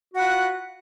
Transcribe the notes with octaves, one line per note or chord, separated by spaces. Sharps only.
F4 F#4 B4 F#5